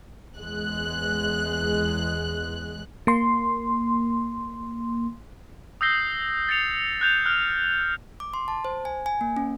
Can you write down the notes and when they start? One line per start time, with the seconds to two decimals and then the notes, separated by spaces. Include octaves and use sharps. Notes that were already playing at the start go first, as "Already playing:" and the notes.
0.38 E2 G#3 F#6
3.07 A#3 C6
5.81 D#6 E6 G6 A#6 C7 G7
6.49 A6 C7 C#7 F7
7.01 F#6 G6 F7
7.26 F6 F#6
8.20 D6
8.34 C6
8.48 A5
8.65 C5
8.85 G#5
9.06 G#5
9.21 A#3
9.37 C#4